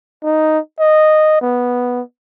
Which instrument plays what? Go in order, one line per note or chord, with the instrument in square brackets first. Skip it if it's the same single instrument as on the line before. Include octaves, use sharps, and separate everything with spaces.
[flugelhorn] D#4
D#5
B3